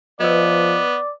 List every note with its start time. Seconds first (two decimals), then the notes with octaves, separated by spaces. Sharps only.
0.21 F3 B3 B4 D5 D#5